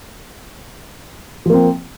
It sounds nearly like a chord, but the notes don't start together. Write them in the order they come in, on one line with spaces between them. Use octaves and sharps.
F3 A#3 C4